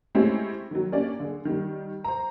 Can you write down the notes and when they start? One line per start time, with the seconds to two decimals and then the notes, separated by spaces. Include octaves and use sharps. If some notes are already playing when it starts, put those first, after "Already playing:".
0.15 G#3 A3 C4 C#4 E4 G4
0.71 D#3 F#3
0.92 A#3 C#4 D4 G4 D5
1.20 D3 G#4
1.45 D#3 G3
2.04 C5 A#5